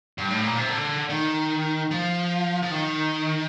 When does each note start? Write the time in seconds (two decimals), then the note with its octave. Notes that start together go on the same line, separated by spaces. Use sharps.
0.18 G2
0.30 A2
0.44 A#2
0.57 C3
0.69 D3
1.10 D#3
1.91 F3
2.63 F3
2.71 D#3